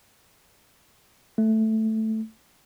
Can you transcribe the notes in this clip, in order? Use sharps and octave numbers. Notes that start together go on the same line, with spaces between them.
A3